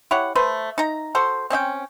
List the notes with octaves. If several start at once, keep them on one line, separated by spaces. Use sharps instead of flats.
E4 G4 C#5 F#5
A3 B4 C5
D#4 A#5
F#4 A4 C5
C4 C#4 E5 G5